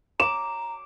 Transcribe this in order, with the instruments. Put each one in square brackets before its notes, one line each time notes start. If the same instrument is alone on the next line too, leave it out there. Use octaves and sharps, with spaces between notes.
[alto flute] A#5 [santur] D6 [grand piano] E7